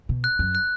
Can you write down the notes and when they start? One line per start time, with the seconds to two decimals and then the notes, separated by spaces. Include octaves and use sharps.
0.09 B2
0.24 F#6
0.39 F#2
0.55 F#6